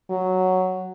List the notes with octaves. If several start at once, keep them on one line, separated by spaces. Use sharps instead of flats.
F#3